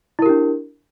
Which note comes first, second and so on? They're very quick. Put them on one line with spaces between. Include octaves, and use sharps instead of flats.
E4 A#4 G4 D4